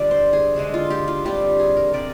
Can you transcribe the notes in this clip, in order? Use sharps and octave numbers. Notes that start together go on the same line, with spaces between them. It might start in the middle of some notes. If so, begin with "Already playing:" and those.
Already playing: D3 G3 D4 F4 D5
C5
G#4
D3 G#3 D4
F4
G4
F4
D3 G3 C4 F4 G4
G#4
A#4
C3 G3 C4 D5